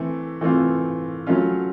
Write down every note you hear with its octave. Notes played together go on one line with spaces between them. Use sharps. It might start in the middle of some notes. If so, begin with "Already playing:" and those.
Already playing: E3 A3 C4
E3 A3 C4 F4
F#3 A3 C#4 F4